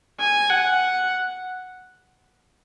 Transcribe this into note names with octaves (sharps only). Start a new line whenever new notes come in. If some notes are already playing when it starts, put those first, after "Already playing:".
G#5
F#5